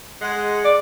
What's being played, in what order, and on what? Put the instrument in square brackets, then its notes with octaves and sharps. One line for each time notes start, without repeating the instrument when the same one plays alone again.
[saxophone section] G#3 F#5
[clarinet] D5